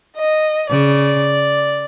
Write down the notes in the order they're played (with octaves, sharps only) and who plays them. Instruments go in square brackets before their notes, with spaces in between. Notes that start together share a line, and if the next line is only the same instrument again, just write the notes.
[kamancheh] D#5
[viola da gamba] C#3 [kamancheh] D5